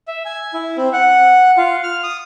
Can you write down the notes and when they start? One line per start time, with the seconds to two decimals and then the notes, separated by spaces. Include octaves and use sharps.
0.08 E5
0.25 G#5
0.54 E4
0.77 C4
0.93 F#5
1.57 F4
1.83 F6
2.03 D#6